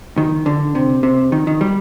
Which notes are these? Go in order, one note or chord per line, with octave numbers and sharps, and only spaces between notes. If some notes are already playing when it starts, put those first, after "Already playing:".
D#3
D3
C3
C3
D#3
D#3
G3